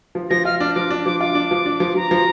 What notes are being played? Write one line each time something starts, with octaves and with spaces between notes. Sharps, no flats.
F3
F3 A#6
F4 F6
D4 F6
F3 D6
D4
F3 D6
F4 D6
D4
F3
D4
F3
F3 A#5
F3